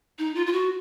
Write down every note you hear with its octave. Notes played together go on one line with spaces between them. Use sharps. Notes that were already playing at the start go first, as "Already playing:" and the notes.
D#4
F4
F4
F#4